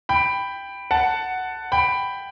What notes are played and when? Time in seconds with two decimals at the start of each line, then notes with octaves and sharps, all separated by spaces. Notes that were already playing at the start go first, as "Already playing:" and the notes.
0.09 G5 B5
0.91 F#5 A5
1.72 G5 B5